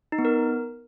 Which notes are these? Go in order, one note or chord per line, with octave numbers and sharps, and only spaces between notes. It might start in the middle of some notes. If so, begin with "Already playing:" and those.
D#4
B3
A#4